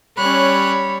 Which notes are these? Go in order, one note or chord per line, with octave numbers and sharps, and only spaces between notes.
G3 C#4 C#5 B5 F#6